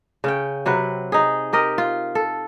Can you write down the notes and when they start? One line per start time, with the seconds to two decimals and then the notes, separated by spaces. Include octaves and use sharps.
0.24 C#3 C#4 G5
0.66 C3 F#3 C4 B4
1.12 D#4 G#4
1.53 G4 A#4 D#5
1.78 F4
2.15 A4